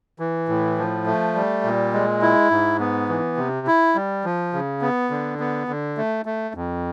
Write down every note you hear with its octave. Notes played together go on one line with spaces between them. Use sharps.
E3
A2
F3
A3
G3
A#2
G#3
E4
G#2
B3
E3
C3
E4
G3
F3
C#3
B3
D3
B3
D3
A3
A3
F2